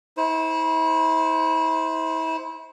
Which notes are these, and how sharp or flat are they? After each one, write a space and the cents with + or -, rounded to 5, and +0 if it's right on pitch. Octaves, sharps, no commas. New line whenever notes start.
E4 -35 C5 +0